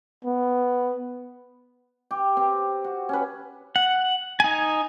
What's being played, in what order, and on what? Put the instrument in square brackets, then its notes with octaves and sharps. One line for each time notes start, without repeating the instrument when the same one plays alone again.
[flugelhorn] B3
[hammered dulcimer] G4
C4
F#4
C#4 B4
[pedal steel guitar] F#5
D#4 G#5